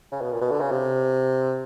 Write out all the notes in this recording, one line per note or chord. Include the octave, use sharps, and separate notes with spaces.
C#3
B2
A#2
B2
D3
C#3
C3